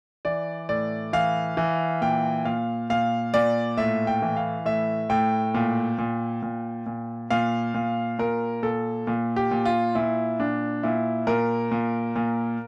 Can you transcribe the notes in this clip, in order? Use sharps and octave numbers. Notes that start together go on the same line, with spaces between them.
E3 D5
A2 D5
E3 F5
E3
A#2 G5
A#2 F5
A#2 F5
A#2 D5
A2 E5
G5
E3
F5
A2 E5
A2 G5
A#2
A#2
A#2
A#2
A#2 F5
A#2
A#2 A#4
A#2 A4
A#2
G4
A#2
F4
A#2 E4
A#2 D4
A#2 E4
A#2 A#4
A#2
A#2